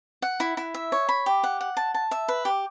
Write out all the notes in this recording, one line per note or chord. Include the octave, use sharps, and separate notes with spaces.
F#5
E4
E4
E5
C#5
B5
G4
F#5
F#5
A5
A5
E5
B4
G4